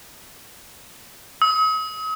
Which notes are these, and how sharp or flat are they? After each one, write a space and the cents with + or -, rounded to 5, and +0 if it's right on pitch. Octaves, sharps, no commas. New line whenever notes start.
D#6 +45